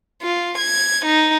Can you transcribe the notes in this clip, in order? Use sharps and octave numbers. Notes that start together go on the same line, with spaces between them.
F4
G#6
D#4